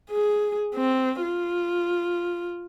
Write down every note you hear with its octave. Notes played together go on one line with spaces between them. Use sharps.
G#4
C4
F4